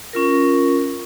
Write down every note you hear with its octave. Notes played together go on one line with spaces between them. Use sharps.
C#4 F4 A#4